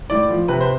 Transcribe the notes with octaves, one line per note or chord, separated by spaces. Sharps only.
A2 D5
F3
C3 B4
C5